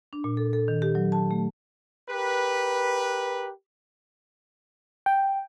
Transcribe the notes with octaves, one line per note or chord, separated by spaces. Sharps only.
D4
A#2
A4
A4
D#3
G4
F#3
A5
A3
G4 A#4 B4
G5